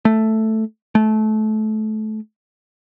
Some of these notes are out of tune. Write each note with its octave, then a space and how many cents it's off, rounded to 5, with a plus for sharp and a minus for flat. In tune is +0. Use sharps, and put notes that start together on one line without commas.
A3 +0
A3 -25